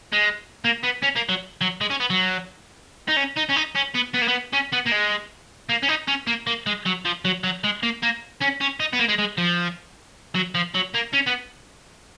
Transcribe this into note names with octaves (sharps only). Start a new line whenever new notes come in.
G#3
A#3
B3
C#4
A#3
F#3
F#3
G#3
C#4
B3
F#3
D#4
C#4
D#4
C#4
D#4
C#4
B3
B3
A#3
B3
C#4
B3
A#3
G#3
A#3
C#4
D#4
C#4
A#3
A#3
G#3
F#3
F3
F#3
F#3
G#3
A#3
A#3
C#4
C#4
D#4
B3
A#3
G#3
G#3
F3
F#3
F3
F#3
A#3
C#4
B3